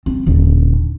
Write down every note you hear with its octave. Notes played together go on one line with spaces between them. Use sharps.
C4
D#1 D3